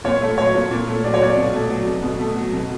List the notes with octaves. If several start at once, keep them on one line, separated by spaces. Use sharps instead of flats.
A#2 C#5
A3
F#3 C#5
A#2
A#2
A3
F#3 D5
C#5
A#2 D5
B2
A3
F#3
B2
B2
A3
F#3
B2